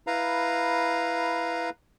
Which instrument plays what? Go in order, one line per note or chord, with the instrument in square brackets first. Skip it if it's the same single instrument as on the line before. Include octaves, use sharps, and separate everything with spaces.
[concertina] E4 B4 F5 A#5